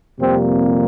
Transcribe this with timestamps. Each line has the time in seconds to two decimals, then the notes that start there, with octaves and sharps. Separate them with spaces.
0.19 F2 C3 G3 A#3 C4